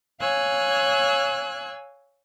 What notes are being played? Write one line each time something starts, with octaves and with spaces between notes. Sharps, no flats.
C#5 F5 G#5 E6 F#6 G#6